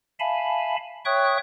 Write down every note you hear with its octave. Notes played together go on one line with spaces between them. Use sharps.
E5 F5 G#5 A5 B5
C#5 E5 G5 C#6 D#6 F#6